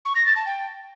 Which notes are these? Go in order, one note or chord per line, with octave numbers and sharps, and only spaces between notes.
C#6
A#6
A6
A5
G5